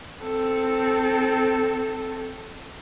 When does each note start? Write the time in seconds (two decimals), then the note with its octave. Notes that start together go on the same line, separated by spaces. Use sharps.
0.23 C4 A4